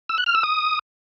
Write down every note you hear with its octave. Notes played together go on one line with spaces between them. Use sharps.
E6
F#6
F6
E6
D#6